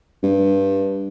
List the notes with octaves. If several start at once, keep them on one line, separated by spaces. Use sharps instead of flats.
G2